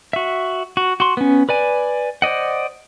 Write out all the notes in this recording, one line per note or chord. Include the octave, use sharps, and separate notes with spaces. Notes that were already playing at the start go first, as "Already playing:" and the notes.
F#4 E5
F#4
F#4 C6
B3 C#4
B4 D5 G#5
C5 D5 D#5 F#5